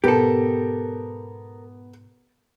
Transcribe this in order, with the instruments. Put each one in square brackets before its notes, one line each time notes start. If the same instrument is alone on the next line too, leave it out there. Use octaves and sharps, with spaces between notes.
[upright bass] G#2 B2 [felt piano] B3 [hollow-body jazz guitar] G4 A4 [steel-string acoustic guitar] A#4